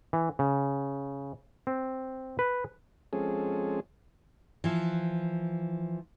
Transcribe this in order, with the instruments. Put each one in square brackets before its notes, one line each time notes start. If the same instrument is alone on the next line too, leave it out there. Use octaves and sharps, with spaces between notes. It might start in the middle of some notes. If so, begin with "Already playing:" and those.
[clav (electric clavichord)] E3
C#3
C4
B4
[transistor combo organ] F3 G#3 C4 C#4 G#4 A4
[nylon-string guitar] E3 F3